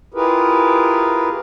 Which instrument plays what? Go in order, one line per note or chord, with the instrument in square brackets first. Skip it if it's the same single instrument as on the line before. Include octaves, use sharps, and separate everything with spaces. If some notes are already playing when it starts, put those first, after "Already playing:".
[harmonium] E4 F4 G4 G#4 A#4 B4